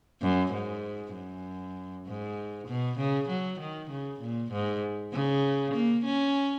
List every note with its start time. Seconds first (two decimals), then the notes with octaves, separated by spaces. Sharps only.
0.22 F#2
0.52 G#2
1.14 F#2
2.06 G#2
2.67 B2
2.98 C#3
3.28 F#3
3.59 D#3
3.90 C#3
4.20 A#2
4.51 G#2
5.12 C#3
5.74 A#3
6.04 C#4